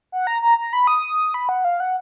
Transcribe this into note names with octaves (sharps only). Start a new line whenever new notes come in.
F#5
A#5
A#5
A#5
B5
D#6
B5
F#5
F5
F#5